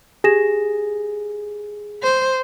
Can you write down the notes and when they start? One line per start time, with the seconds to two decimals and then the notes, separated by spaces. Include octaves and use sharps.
0.24 G4 G#4 A#6 E7
2.03 C5